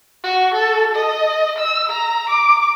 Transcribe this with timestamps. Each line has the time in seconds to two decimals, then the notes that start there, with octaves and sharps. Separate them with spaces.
0.24 F#4
0.54 A4
0.95 D#5
1.59 E6
1.90 A#5
2.29 D6